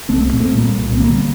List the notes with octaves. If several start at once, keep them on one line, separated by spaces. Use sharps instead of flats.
C2 A3 C4
A#2
A3 C4
A#2 G3 A#3
C2
C4
D3 G3 A#3